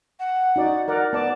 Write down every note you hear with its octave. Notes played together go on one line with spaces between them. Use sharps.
F#5
D#4 F#4 D5
A#4 D5 F#5
B3 D5 A5